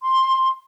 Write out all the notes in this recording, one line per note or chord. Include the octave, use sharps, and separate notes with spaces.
C6